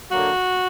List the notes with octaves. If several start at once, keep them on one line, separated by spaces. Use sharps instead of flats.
D3 F#3 A#3 F#4